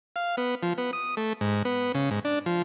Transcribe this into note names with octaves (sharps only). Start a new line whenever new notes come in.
F5
B3
F3
B3
D#6
A3
G#2
B3
C#3
G#2
D4
F3